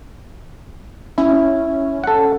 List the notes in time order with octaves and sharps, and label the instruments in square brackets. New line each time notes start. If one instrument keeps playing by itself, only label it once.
[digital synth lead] C#4 [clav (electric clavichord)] E4
[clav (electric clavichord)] A4 F#5